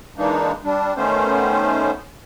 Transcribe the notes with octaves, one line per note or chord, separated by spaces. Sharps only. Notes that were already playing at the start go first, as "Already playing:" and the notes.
E3 G#3 A#3 D4 D#4
G3 D4
D#3 A3 B3 C#4 C5